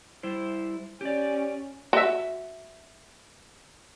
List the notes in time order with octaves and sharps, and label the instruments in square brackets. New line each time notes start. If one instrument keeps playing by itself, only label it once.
[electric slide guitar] G3 E4 C5
[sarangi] C#4 [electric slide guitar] G4 D5
[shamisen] F#4 E5